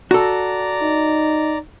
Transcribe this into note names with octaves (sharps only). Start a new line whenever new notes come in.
F#4 A4 D5 A#5
D#4